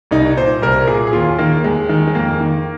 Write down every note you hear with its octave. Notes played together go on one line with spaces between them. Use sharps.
C2 D#4
A#2 C5
C2 A#4
A#2 G#4
G#4
D#2 F4
D#3 A#3
D#2 G#3
D#3
G#3
F2 A#3
D#3